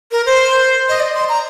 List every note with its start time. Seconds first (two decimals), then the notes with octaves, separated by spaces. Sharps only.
0.12 A#4
0.26 C5
0.89 D#5
1.00 D5
1.14 C6
1.29 A#5